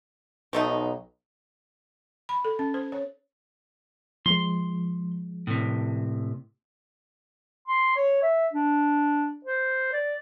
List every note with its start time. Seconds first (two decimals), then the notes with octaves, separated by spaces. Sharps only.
0.53 B1 F3 A3 D#4
2.29 B5
2.45 A4
2.59 C#4
2.74 C5
2.92 C#5
4.26 F3 G#3 C6
5.47 A2 C3
7.68 C6
7.96 C#5
8.22 E5
8.53 D4
9.45 C5
9.93 D5